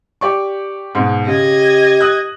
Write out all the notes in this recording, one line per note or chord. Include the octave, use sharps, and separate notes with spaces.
G4 D5 C#6
G#2 B2
C#3 G4 D#5 G#6
D#6 F#6